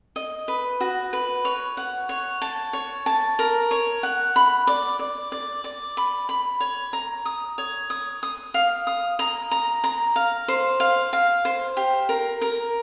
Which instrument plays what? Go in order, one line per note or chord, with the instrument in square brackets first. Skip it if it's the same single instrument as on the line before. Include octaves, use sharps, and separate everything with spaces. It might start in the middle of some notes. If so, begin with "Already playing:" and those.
[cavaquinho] D#5
B4
F#4
B4
C#5
F#5
C#5
A5
C#5
A5
A#4
C#5
F#5
B5
D5
D5
D5
D5
B5
B5
C#5
A#5
D#6
C#5
D#6
D#6
F5
D#6
A#5
A#5
A#5
F5
C5
F5
F5
C5
G4
A#4
A#4